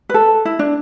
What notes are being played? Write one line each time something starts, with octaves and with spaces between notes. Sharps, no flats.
B4
A4
E4
D4